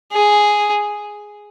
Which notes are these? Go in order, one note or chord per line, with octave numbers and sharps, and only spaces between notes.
G#4